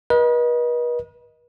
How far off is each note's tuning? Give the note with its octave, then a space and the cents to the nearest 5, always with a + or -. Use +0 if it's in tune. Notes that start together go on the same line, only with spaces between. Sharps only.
B4 -40 D#5 +0